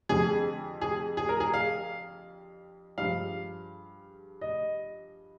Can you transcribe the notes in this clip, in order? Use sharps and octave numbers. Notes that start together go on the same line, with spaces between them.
F2 D3 G3 G#4
G#4
G#4
A#4
G#4
F5
G2 F3 G#3 F5
D#5